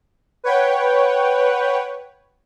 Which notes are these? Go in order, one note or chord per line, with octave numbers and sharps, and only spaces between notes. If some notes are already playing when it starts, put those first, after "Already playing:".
B4 C#5 F#5 G5